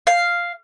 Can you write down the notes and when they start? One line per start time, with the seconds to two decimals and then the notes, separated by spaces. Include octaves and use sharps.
0.07 F5